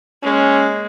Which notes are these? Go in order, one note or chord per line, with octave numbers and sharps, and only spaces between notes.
G#3 A#3 C#4